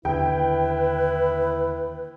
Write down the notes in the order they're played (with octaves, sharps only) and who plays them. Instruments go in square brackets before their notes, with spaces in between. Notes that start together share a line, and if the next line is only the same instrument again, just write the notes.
[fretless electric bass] D#2 D3 [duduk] E4 [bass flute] B4 [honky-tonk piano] G5